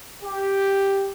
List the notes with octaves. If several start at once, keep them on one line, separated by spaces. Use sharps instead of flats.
G4